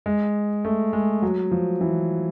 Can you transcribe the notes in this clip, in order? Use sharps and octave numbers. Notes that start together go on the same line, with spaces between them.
G#3
A3
G#3
F#3
F3
E3